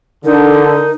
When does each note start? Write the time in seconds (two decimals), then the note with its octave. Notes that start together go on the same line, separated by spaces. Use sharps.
0.25 D3 D#4 A#4